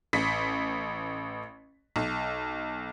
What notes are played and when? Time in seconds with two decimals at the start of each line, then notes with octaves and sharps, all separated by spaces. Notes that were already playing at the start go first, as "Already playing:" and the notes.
0.13 A1 B6
1.96 B1